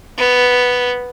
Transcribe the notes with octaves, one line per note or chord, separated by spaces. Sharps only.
B3